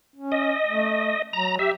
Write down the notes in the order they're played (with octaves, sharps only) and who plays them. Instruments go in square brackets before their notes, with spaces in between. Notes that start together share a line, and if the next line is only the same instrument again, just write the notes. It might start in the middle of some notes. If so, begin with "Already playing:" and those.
[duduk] C#4
[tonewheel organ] D#5
[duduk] A3
[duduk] F#3 [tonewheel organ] A#5
[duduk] G4 [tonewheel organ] E5